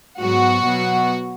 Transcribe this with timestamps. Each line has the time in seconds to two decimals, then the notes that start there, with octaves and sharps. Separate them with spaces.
0.19 G#2 F#3 B3 F#4
0.64 B2 F#3 B3